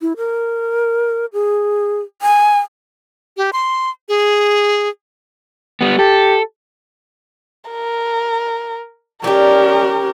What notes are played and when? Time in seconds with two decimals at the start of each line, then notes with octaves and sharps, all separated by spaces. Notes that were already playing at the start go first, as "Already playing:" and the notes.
0.01 E4
0.17 A#4
1.33 G#4
2.22 G#5
3.37 G4
3.53 C6
4.09 G#4
5.81 G3 B3
5.99 G4 A4
7.71 A#4
9.24 G3 A3 C#4 D#4 G4 A#4